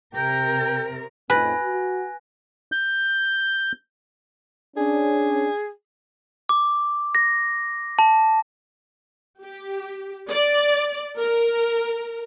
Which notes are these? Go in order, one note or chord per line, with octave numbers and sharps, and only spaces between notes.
C3 A#4 G5
F2 A2 D#4 B4 G#5 F#6 A#6
F#4
G6
C#4 D4 G#4
D6
A#6
A5
G4
D5
A#4